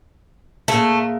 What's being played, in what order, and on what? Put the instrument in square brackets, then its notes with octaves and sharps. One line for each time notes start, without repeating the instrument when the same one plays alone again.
[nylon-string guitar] A#2 G#4 E5 [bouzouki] A3